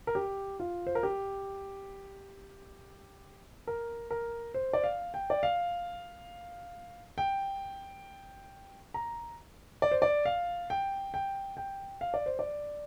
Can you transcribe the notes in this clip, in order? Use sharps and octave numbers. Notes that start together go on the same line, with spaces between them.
A#4
G4
F4
C5
A#4
G4
A#4
A#4
C5
D5
F5
G5
D5
F5
G5
A#5
D5
C5
D5
F5
G5
G5
G5
F5
D5
C5
D5